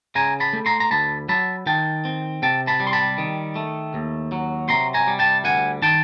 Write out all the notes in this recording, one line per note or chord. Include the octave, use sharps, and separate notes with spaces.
C#3 G#5 A#5
A5 B5
A3
A#5 C6
A#5
D2 A5 B5
F#3 A5 B5
D#3 G5 A5
C4
C3 G5 A5
A5 B5
G3
C6
A5 B5
D#3
A3
D#2
F#3
C3 A#5 C6
G#5 A#5
G3
G5 A5
D2 F#5 G#5
D#3 G5 A5